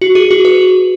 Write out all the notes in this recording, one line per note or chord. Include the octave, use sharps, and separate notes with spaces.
F#4
G#4
F#4
B4